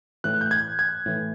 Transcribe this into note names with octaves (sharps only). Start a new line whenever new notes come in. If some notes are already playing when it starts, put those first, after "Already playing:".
A2 E3 F#6
G6
G#6
G#6
A2 E3